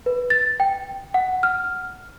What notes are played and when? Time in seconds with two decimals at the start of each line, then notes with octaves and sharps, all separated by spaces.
0.06 B4
0.30 A6
0.60 G5
1.14 F#5
1.43 F6